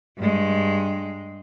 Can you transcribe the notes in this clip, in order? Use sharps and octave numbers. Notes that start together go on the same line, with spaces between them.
G2 G#3